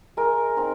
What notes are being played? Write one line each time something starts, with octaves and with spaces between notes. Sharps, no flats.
G#3 A#4
C4 D#4